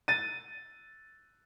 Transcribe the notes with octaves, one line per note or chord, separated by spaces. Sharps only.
A6 D#7